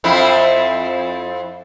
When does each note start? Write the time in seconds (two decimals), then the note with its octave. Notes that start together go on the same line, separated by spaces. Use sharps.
0.04 F2 C4 E4